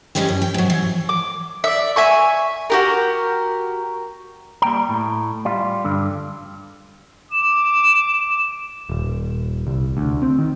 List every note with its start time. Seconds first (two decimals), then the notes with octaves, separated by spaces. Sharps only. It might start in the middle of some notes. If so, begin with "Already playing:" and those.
0.15 D2 E3 G3 G#3 C#4 G4
0.28 F#2
0.42 G5
0.54 G#2 F#3
0.70 E3
1.09 D6
1.64 D5 E5
1.96 E5 G#5 C#6
2.70 F#4 G4 A#4
4.62 G3 A#3 G5 A#5
4.89 A2
5.45 G3 F4
5.85 G2 D3
7.32 D6 E7
8.90 D#1
9.67 C2
9.97 D2
10.22 C4
10.39 D#3